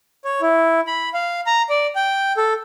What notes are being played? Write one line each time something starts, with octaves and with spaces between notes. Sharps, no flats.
C#5
E4
B5
F5
A#5
D5
G5
A4